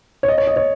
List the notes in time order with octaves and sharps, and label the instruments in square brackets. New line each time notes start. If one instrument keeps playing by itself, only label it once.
[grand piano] C#5
D#5
C#5
D#5
C#5